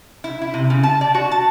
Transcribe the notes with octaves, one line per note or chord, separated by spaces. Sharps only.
E4
E4
C3
C#3
A5
D5
F#4
A5